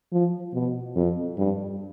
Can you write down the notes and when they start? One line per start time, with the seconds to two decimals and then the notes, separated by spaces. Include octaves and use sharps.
0.12 F3
0.54 B2
0.96 F2
1.37 G2